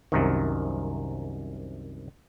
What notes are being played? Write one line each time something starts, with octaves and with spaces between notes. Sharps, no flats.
C2 F#2 C3 D#3